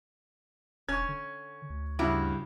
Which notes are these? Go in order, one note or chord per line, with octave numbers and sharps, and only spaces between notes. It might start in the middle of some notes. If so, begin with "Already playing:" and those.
E1 C#4 C#6 G#6
D3
D2
G2 C#3 G3 E4 F#4 D6